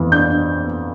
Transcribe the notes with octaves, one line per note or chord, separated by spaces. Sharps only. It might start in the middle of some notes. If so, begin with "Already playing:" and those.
Already playing: F2 E3
D4 G6
D4